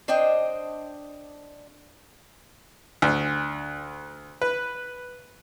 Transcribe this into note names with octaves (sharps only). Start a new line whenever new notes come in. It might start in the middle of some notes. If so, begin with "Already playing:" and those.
D4 C5 D#5 G5
D2
B4